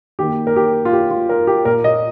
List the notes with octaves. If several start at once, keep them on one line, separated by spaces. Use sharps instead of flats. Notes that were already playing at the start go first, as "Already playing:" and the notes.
D#3 A#3 G4
A#4
G4
F4
G4
F4
A#4
G4
A#2 A#3 A#4
D#5